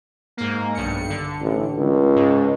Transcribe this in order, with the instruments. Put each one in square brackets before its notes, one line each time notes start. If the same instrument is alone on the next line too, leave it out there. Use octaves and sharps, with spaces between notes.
[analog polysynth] G#2 A#3
B1 G2 C#7
D3
[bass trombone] A1
C#2
[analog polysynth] G#2